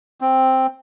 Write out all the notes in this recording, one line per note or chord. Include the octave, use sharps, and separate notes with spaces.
C4